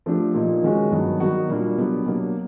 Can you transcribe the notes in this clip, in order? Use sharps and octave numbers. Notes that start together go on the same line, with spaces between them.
F3 A3 D4 G4
A#2 F3 A#3 D#4
D#3 G#3 C#4 F#4
G2 D#3 F#3 B3
D#3 F#3 B3 D#4 F#4
A#2 G3 A#3 D4
B2 F#3 B3 D4 G4
B2 F#3 A#3 D4